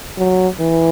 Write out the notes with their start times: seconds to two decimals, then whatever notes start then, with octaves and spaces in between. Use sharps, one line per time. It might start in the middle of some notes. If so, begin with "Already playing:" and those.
0.18 F#3
0.61 E3